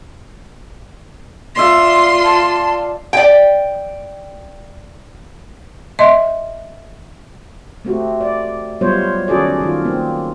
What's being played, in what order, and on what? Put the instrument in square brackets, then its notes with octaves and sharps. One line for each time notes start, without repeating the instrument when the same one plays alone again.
[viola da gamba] F4 [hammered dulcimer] D5 E5 [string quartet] C6
[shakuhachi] A5
[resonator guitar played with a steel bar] D5 G5
[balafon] D#5 E5 C6
[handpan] A3 C4 F#4 G4
D5
F#3 G3 B3 F4 C5 C#5
D#3 C#4 F#4 G#4 A4 D5
D#3 F4
A#3 C4